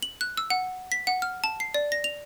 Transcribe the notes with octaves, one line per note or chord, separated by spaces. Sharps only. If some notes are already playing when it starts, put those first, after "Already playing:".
F#7
F#6
E6
F#5
B6
F#5
F6
A5
C7
D5
A#6
F7